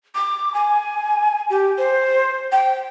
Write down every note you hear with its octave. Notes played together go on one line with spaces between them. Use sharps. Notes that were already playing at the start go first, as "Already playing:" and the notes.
D6
G#5
G4
C5
G5